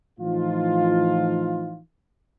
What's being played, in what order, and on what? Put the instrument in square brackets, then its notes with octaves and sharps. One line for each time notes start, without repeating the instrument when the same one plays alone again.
[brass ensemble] A2 E3 F3 D#4 F4